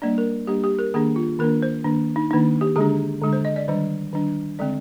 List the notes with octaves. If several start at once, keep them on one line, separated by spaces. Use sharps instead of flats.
G3 A#3 D4 D5
A#4
G3 A#3 D4 G4
G4
A#4
D#3 A#3 D4 G#4
F4
D#3 A#3 D4 A#4
C5
D#3 A#3 D4
D#4
D#3 A#3 D4 D#4
G4
D3 G#3 D4 G#4
D3 G#3 D4
C5
D#5
D5
D#3 G3 D4 C5
D#3 G3 D4
D3 G#3 C4 D5